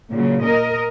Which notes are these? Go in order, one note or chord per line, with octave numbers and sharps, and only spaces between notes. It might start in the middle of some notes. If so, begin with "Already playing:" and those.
A#2 C#3 F#3
A#4 D#5